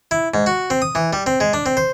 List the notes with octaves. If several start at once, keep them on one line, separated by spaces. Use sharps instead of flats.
E4
G#2
F#4
C4
D#6
E3
G3
C4
G#3
D4
C4
C5